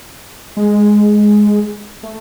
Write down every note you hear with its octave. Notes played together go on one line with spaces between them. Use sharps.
G#3
A3